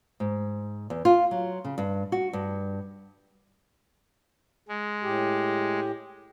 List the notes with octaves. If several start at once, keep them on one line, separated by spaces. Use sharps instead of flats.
G#2
E2
F4
F#3
C#3
G2
F#4
G2
G#3
A2 G4